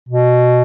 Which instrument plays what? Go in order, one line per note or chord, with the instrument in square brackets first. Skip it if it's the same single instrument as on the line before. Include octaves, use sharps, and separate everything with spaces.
[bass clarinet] B2